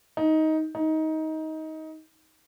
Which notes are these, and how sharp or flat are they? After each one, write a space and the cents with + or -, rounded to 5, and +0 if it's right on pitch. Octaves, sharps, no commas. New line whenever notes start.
D#4 +15
D#4 +20